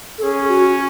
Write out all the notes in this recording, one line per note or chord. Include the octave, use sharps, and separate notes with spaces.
A4
C#4 G#4
F#4